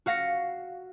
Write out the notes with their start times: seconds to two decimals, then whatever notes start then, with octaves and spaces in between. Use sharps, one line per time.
0.06 F#4 F5 A#6 C7 C#7